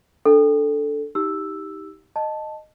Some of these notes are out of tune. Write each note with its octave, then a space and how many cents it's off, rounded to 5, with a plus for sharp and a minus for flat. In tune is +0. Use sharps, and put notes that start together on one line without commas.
D4 +0 A4 +0
D#4 +30 G4 +0 E6 +0
D#5 -10 A5 +0